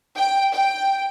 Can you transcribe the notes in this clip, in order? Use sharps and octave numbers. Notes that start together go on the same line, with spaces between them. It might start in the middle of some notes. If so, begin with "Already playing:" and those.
G5
G5